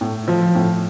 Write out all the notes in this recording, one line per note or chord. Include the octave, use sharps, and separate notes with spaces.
A2
F3
A2